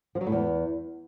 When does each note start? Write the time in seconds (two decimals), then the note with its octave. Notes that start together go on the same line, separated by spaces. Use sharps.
0.15 F3
0.21 F#3
0.26 A2
0.32 E2